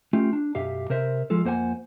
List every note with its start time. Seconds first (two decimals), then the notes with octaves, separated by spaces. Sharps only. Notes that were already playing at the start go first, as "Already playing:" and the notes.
0.13 A3 C#4 F4 G4
0.33 D4
0.55 B1 F#2 G4 E5 F5
0.90 C3 A#4 C5 E5
1.30 F3 G#3 F4 A4
1.44 F2 A#3 C5 F#5 G#5